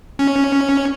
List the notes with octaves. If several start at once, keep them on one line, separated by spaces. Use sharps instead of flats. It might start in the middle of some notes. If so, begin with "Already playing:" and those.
C#4